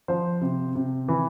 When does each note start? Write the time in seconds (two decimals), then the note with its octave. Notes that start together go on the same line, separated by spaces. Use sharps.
0.08 F3 C5
0.41 C3
0.75 C3
1.08 E3